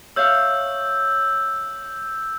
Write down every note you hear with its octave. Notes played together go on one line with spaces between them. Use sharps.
C#5 E5 F5 E6 G6